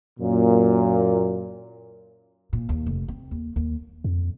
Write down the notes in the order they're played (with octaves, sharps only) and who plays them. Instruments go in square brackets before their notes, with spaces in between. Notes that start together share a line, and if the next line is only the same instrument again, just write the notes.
[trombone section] F#2 A#2
[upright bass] A#2
D#2
F1
C4
D#2
D#2
[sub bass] F2